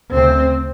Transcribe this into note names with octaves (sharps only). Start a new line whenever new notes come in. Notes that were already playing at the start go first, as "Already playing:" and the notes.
D2 C#3 C4